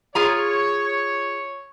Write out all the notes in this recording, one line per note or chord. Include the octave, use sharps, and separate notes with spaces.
F4 G#4 C#5 A#5